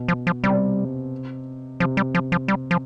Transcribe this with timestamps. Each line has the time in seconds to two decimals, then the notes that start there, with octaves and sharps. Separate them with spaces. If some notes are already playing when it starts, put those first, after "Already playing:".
Already playing: B2
0.08 F3
0.27 F3
0.44 C3 G3
1.80 C3 F3
1.97 G3
2.15 F3
2.32 F3
2.48 G3
2.71 F3